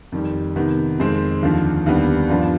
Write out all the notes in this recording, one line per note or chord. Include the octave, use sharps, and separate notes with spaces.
F2 D#3 G3
C3 D#3 B3
F2 D#3 G#3 C4
D#2 D3 F3
D#2 D3 G3 B3
G2 F3 B3 D4 F4